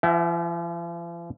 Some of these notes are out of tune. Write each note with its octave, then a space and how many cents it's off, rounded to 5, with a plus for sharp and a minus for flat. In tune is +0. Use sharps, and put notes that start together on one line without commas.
F3 -45 E5 +15 G5 -40